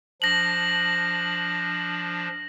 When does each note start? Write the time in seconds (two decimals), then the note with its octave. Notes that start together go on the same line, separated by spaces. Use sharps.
0.22 F3 D4 A#6 F#7